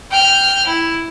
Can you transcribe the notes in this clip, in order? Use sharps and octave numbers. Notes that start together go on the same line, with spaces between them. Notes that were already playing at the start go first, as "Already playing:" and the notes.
G5 F6
E4